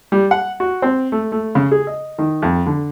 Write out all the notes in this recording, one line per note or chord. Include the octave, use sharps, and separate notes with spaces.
G3
F#5
F#4
C4
A3
A3
C#3
G#4
D#5
D#3
F2
D3